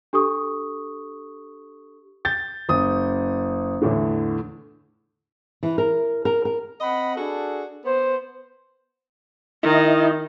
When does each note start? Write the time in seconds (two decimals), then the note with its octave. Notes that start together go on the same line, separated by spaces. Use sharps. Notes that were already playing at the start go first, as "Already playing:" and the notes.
0.13 D4 G4 A4 C#6 D#6
2.25 G6 A6
2.69 F#1 D#6
3.82 E2 A2 D3
5.63 E3
5.78 A#4
6.25 A#4
6.45 A#4
6.81 C4 D#5 F#5 B5
7.16 D4 F#4 G#4 A4
7.84 B3 C5
9.63 D#3 E4 D#5